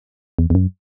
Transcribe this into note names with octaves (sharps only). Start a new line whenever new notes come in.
E2
E2
F#2